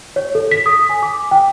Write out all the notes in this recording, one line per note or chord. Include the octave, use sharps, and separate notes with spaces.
C#5
A4
B6
D#6
G#5
D6
G5